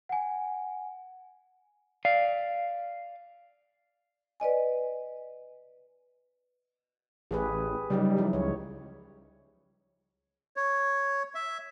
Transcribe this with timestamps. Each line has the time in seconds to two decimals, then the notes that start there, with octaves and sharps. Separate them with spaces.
0.09 F#5 G#5
2.05 D5 F5
4.40 B4 D5 D#5 G#5
7.31 A1 G4 G#4 B4
7.90 C#3 F#3 G3 D#4
8.17 F3 E4
8.33 C#2 C#5
10.56 C#5
11.35 E5